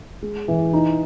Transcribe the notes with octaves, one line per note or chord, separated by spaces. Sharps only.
G#3
E3
D#4